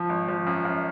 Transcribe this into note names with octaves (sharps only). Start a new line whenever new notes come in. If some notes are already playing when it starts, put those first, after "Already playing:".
Already playing: F3
G#1
F3
F#2
F#2